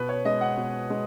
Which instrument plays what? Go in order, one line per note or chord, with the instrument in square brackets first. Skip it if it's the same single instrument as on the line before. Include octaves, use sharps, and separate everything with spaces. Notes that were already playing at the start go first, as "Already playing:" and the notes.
Already playing: [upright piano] B2 B4
C#5
G#3 D#5
F#5
B2
G#3